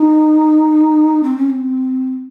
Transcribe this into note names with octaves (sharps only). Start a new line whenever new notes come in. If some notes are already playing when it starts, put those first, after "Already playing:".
Already playing: D#4
C4
C#4
C4